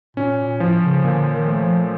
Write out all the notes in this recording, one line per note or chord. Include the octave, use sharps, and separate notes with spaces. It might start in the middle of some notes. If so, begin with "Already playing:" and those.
A#2 C#4
A#2
A2 F3
C#3
A#2 D3
D#3
A3
F3